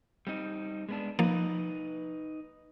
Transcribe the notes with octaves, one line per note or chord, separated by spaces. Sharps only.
G3 C4 D#4
G#3 B3 D4
F3 A#3 D#4 B4